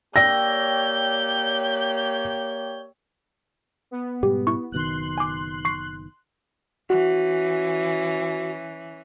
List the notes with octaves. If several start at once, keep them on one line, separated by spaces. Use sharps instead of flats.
A#3 G4 C#5 D5 G5 E6 G6 A#6
B3
G#2 B2 G3 G4
E4 C#6
F#1 B2 D#3 C6 F#6
G#5 D6
C#6 C7
E3 C#4 F#4